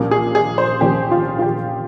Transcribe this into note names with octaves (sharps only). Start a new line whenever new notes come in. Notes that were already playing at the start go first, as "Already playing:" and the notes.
Already playing: C2 A#2 F3 A#3 C#4
G#4
G#4
C5
C2 A#2 F3 A#3 C#4 G4
F4
F4
G4